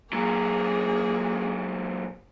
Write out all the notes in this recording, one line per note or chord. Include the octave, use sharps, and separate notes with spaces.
A#2 F#3 A#3 G#4